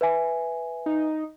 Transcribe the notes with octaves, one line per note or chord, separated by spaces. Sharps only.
B4 E5 G#5
D#4